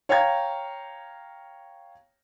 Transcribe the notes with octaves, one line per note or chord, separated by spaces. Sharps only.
C#5 F5 G5 A#5 G#6